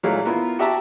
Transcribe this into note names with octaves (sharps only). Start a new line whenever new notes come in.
A#2 E3 F#3 G#3 A3 F5
A#3 B3 E4 F4
F#4 G4 E5 A5 A#5